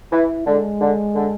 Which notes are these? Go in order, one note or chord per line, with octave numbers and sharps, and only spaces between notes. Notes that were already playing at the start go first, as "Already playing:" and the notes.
E3 E4
D3 G#3
D3
D3